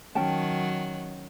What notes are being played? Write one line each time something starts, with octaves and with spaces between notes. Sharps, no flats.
D#3 F#3 C#4 G5 A5